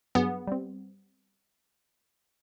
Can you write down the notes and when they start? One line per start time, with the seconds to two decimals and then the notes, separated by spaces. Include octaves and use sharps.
0.15 G2 F#3 B3 G#4
0.47 G3 C4